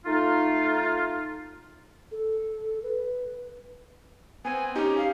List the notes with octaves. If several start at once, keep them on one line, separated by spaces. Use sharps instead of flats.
A3 D#4 F4
A4
B4
B3 C4 G#5
C#4 D#4 G4
F5